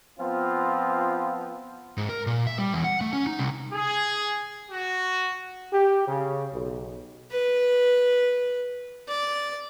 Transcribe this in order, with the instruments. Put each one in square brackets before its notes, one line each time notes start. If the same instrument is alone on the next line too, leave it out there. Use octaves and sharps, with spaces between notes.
[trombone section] F3 B3 C4 F4
[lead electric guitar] G#2
A#4
A#2
E5
G3
E2
F#5
A3
C#4
D#4
C2
[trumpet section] G#4
F#4
[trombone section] G4
C#3
B1
[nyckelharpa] B4
D5